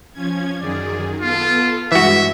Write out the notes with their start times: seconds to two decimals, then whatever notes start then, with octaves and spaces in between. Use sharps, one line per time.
0.13 F3 C#4 G#6
0.61 F#2 D#3 G#4 D5
1.20 B3 F4 A4
1.92 G2 E3 G#3 F#4 E5